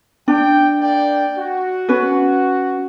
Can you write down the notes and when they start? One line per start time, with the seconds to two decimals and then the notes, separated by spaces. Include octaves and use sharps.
0.28 D4 G5
0.80 A#3 D5 G5
1.38 F#4
1.89 C#4 B4